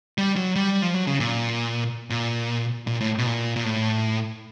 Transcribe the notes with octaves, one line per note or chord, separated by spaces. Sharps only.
G3
F#3
G3
F3
F#3
C#3
A#2
A#2
A#2
A2
B2
A#2
A#2
A2